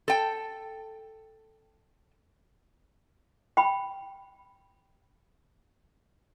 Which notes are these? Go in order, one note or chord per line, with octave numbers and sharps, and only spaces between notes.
A4 G5
G5 B5